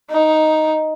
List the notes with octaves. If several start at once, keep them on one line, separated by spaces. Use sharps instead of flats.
D#4